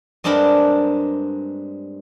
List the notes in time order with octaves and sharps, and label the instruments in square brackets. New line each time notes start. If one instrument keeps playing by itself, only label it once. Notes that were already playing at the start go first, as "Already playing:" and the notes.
[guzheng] G2 G#3 C4 D4 A#4 B5